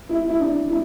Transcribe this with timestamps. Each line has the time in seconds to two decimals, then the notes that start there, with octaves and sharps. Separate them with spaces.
0.09 E4
0.29 E4
0.39 D4
0.69 E4